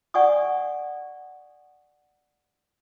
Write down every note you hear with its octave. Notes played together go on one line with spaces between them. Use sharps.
D5 F#5 G#5 C#6 D#6